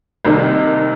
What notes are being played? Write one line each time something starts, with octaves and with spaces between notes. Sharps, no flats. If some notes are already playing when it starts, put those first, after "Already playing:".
C2 C3 D#3 A#3 D#4